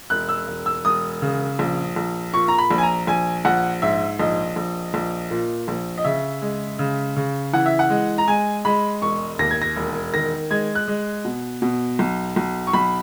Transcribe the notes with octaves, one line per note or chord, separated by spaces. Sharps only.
E1 F#6
E6
E1
E6
E1 D#6
C#3
A#1
A#1
A#2 C#6
A#5
B5
A#1
G#5
A#5
A#1 G#5
A#1 F#5
G#2 E5
A#1 D#5
A#1
A#1
A#2
A#1
D#5
C#3 E5
G#3
C#3
C#3
E3 F#5
E5
F#5
G#3
A#5
G#3 G#5
G#3 B5
E1 C#6
D#2 A#6
G#6
A#6
E1
D#3 A#6
G#3 G#6
F#6
G#3
B2
B2
B1
B1
C#6
B1 B5